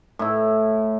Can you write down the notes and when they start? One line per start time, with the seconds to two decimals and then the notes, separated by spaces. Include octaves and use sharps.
0.19 A2 E4